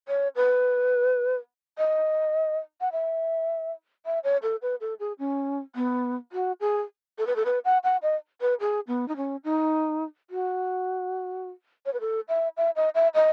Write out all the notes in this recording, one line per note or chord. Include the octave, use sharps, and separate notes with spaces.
C#5
B4
D#5
F#5
E5
E5
C#5
A4
B4
A4
G#4
C#4
B3
F#4
G#4
A4
B4
A4
B4
F#5
F#5
D#5
B4
G#4
B3
D#4
C#4
D#4
F#4
C#5
B4
A4
E5
E5
D#5
E5
D#5